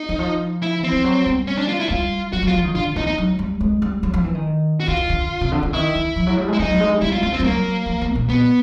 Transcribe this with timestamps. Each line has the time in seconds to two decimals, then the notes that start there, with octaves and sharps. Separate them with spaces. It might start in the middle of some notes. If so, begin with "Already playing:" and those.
Already playing: D#4
0.09 E3
0.19 F3
0.62 E4
0.80 E3 C4
0.92 F3
1.04 F#3
1.26 G3
1.47 C#4
1.57 D4
1.68 F4
1.80 E4
1.89 G3 F4
2.33 F#3 F#4
2.43 F#3
2.47 F4
2.54 F3
2.64 D#3
2.75 D3 F4
2.96 E3 D#4
3.07 D#4
3.18 F#3
3.39 G3
3.61 G#3
3.82 G3
4.03 F#3
4.14 F3
4.24 E3
4.35 D#3
4.80 F#4
4.88 D#3 F4
5.10 D3
5.41 C3
5.52 D3
5.63 C#3
5.73 D#3 E4
5.95 E3
6.16 F3
6.27 F#3
6.37 G3
6.48 G#3
6.53 E4
6.59 F#3 D#4
6.65 G3
6.70 F#3
6.80 G#3
6.90 G3
7.01 G3 E4
7.12 F4
7.23 G3 F4
7.33 C4
7.40 G3
7.44 F#3 A#3
7.86 F3
8.01 D#3
8.15 A#2
8.29 A#2 B3